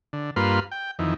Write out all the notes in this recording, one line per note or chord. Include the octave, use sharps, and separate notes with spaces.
D3
G2 A#3 F4 B4 C6
G5
F2 D#3 E3